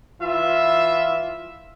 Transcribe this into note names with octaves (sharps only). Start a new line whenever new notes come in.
E3 F4 E5